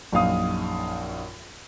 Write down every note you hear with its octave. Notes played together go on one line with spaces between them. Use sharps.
A#1 F#2 D#4 F5 D#6